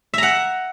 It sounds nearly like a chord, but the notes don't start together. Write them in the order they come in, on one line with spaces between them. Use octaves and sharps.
E5 A#5 F#5